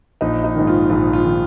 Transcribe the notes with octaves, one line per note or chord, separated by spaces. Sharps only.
A#1 D#4
D#4
G#2 D#3
F4
A#1 F4
F4
D#3